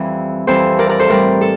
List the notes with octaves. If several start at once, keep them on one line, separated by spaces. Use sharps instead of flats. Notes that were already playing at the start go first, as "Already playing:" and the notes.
Already playing: F2 E3 G3
F2 E3 G3 A4 C5
A#4 D5
A#4 D5
A4 C5
A2 G3 A#4 D5
A4